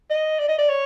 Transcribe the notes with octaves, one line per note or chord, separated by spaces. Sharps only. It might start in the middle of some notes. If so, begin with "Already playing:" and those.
D#5
D5
D#5
D5
C#5